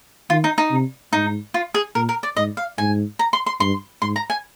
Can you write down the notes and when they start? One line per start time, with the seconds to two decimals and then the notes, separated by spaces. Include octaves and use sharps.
0.30 D#3 F4
0.44 D#4
0.58 D#4
0.71 C3
1.12 G#2 D#4
1.54 F4
1.74 G#4
1.95 A#2 A#4
2.09 A#4
2.23 D5
2.37 G#2 D#5
2.57 F5
2.78 G#2 G#5
3.19 A#5
3.33 C6
3.46 C6
3.60 G2 C6
4.02 G#2 C6
4.16 A#5
4.30 G#5